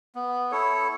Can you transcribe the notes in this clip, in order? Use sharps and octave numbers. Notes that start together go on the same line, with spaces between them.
B3
E4 A4 C#5